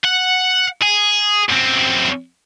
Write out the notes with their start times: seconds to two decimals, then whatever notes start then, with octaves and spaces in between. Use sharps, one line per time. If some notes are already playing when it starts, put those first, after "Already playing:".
0.04 F#5
0.82 G#4
1.49 F#2 C4